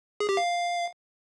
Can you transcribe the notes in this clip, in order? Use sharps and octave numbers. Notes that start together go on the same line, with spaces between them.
G#4
G4
F5